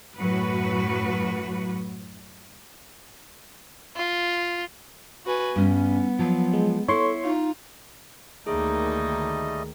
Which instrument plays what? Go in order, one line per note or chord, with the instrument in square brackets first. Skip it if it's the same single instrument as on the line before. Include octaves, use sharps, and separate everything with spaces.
[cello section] F#2 A2 F#3 F#4 B4
[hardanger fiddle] F4
[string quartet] F#4 B4 G#5
[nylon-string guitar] G2 [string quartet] B3 [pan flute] C#4
[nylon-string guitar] F3 [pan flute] F#3
[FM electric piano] G#3
[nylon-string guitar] E4 [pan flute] A4 [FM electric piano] C#5 C6 C#6
[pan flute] D#4 [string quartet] F4
[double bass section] D2 D#3 [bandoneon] G3 A3 D#5 [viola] A#3 D#4 [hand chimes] G#4